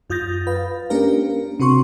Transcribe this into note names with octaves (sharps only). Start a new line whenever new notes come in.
F#2 F4 D#6 G6 A6 A#6
B4 F5
A#3 C#4 D4 G4 A#4 F5
C3 C4 F#4 C6 C#6